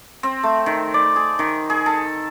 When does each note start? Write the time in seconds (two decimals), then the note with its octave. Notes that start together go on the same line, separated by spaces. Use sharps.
0.23 C4
0.43 A3
0.66 D#3
0.94 D5
1.16 G#4
1.39 D#3
1.70 G#4
1.86 A4